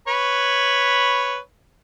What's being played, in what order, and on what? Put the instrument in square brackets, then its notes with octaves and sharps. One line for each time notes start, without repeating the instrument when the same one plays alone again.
[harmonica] B4 C#5 B5